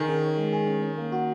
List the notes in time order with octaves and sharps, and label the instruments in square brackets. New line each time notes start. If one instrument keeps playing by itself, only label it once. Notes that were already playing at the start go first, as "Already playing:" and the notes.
Already playing: [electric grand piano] D#3 [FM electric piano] G#4
[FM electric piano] C#4
C#5
G#3
G#4
C#4
C#4
A#3
F#4